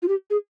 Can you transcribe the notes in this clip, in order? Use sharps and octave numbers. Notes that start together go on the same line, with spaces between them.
F4
G4
G#4